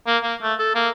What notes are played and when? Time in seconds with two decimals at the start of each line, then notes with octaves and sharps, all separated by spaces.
0.07 A#3
0.23 A#3
0.42 A3
0.59 A4
0.75 A#3